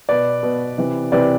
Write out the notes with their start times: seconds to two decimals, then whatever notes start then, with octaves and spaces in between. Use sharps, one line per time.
0.09 B2 B4 D5
0.43 B2
0.78 C3 E3
1.12 C3 E3 B4 D5